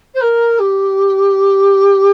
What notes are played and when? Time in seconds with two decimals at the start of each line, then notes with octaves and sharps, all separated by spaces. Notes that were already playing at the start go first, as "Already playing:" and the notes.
0.14 C5
0.20 A#4
0.59 G4